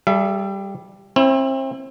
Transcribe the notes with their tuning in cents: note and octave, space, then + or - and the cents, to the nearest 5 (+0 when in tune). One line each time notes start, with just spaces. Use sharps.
G3 +0 A4 -45 E5 +40
C4 +35 E4 +0